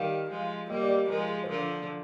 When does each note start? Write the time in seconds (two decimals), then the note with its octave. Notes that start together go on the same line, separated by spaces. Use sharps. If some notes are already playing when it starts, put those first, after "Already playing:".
Already playing: D#3 G3 F5
0.30 F3 G#3
0.70 G3 A#3 D#5
0.83 D5
0.89 D#5
1.09 F3 G#3 A#4
1.29 G#4
1.43 C5
1.49 D3 F3 A#4